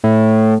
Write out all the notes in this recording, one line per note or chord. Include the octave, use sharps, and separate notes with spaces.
A2